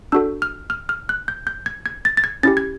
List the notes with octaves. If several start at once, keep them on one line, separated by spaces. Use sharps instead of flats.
D4 F#4 A4 E6
F6
F6
F6
F#6
G6
G6
G#6
G#6
A6
A6
G#6
C#4 E4 G4 A6
G#6